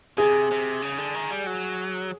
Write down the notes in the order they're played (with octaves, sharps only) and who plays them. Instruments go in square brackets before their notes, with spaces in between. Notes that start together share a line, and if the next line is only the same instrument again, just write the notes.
[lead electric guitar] C3 [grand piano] G#4
[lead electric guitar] C3
C#3
D3
D#3
G3
F#3